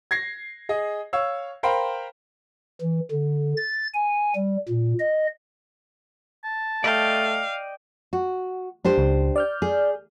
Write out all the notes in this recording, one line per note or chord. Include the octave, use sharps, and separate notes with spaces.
G#6 A#6 C7
G#4 D#5
C#5 F5 E6
A#4 C5 F5 G5 B5
E3
D3
A6
G#5
G3
A#2
D#5
A5
A3 D5 D#5 F5 G5
F#4
D4 G4 C5
C#2
D5 F6 G6
G#4